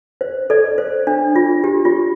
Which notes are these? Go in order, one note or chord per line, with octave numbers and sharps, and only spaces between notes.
C5
A4 D5
C5
D4
F4
G4
F4